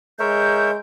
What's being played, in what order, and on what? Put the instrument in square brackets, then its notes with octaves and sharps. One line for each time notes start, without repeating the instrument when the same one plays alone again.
[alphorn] G#3 [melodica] A#4 C#5 E5 [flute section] G6